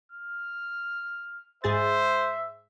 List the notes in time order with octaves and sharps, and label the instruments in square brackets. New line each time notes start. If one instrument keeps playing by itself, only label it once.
[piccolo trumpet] F6
[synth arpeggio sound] G#2 G#4 A6 [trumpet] C5 [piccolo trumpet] E5